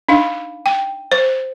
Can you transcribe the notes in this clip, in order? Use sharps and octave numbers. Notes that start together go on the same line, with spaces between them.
D4 D#4 F5
G5
C5